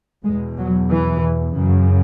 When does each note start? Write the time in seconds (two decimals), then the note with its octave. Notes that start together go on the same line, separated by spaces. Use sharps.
0.24 E2 B2 G#3
0.57 F#3
0.90 E3
1.55 F#2 C#3